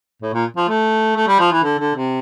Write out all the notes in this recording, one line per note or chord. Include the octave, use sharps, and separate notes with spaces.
A2
A#2
F3
A3
A3
G3
F3
E3
D3
D3
C3